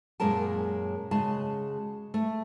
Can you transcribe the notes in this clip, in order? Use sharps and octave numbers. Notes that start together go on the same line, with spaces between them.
F#2 A#2 G#3 C#4 A#4 A5
C#3 G#3 F#4 A5
A3